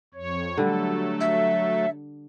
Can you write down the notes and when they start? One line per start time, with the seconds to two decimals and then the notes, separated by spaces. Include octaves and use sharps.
0.14 F2 C#5
0.58 D3 F#3 G3 A3 A4
1.21 E5